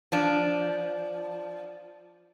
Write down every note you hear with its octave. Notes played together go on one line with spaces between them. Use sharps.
F3 D4